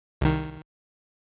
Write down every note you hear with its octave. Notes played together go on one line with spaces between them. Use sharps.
C2 D#3